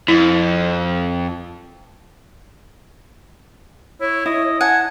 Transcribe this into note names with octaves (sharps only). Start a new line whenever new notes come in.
F2 E4
E4 C#5
E4 D#5
F#5 G#5 A5